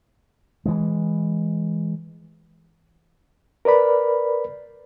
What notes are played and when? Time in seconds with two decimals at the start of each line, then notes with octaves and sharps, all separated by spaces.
0.66 E3 G#3
3.65 A#4 B4 D5 B5